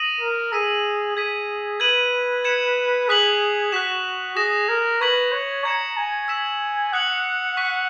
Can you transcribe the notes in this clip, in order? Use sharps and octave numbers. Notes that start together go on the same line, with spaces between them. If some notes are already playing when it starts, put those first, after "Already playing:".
Already playing: D#6 A#6 D#7 F#7
A#4
G#4 E6 B6 D#7
G#4 G#6 B6 D#7
B4 G#6 D#7 F#7
G#6 C#7 E7
G#4 D#6 F#6 B6 F#7
F#4 F#6 B6 E7
G#4 D#6 A#6 E7
A#4
B4 C#6 G#6 B6 F#7
C#5
A#5 G#6 C#7 E7
G#5
E6 B6 E7
F#5 D#6 F#6 C#7 F#7
C#6 F#6 B6